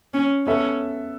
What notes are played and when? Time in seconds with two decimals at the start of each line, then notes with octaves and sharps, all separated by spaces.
0.14 C#4
0.47 B3 C#4 A4 E5